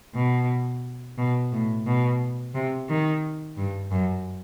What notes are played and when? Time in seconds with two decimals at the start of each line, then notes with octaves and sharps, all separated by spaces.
0.15 B2
1.18 B2
1.52 A2
1.86 B2
2.55 C3
2.89 D#3
3.57 G2
3.91 F#2